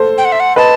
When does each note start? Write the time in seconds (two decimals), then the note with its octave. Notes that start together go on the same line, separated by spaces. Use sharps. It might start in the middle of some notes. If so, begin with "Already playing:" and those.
Already playing: A4 C5
0.18 G5
0.25 F#5
0.32 E5
0.40 F#5
0.56 B4 D#5 A5